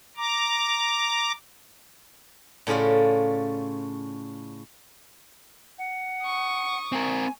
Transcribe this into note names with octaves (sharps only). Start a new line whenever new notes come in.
A#5 D6
A2 C#3 C#4 F4 D5
F#5
C#6 D#6
C4 A#4 G#5